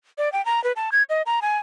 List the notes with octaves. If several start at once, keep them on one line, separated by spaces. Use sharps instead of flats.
D5
G5
A#5
B4
A5
G#6
D#5
A#5
G#5